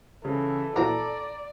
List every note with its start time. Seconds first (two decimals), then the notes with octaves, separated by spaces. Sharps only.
0.25 C#3 E3 A4
0.76 A#1 E3 F#3 D5 A#5